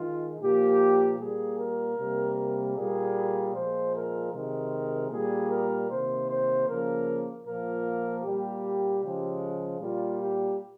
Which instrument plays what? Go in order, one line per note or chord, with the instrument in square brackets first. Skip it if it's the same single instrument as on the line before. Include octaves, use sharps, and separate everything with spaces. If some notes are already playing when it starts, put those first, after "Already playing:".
Already playing: [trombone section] D#3 G#3 F4
A#2 F3 A#3 G4
A#2 G3 A#3 G#4
A#4
C3 G3 A#3
A#2 G3 A#3 G#4
A#2 F3 G#3 C5
A#4
C3 D#3 G#3 A#4
A#2 G3 A#3 G#4
A#4
C3 D#3 A#3 C5
C5
C#3 F3 A#3 A#4
A#2 F3 A#3 A#4
A#2 G3 A#3 G4
C#3 F3 G#3
A#2 G3 A#3 F4
G4